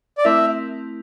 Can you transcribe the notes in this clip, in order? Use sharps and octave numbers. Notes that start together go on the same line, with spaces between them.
D5
A3 C4 E4 A#4 E5